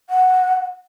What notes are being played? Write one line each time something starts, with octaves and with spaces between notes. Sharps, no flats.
F#5